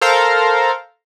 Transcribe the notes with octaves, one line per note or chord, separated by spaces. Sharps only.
A4 A#4 C5 F5 A#5